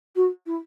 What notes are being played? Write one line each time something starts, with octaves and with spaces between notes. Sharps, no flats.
F#4
E4